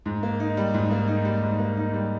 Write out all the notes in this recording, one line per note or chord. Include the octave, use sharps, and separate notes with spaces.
G#2
A#3
D#4
G3
G#2
A#3
D#4
G3
G#2
A#3
D#4
G3